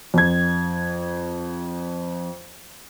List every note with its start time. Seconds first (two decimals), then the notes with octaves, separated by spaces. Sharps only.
0.14 F2 G#6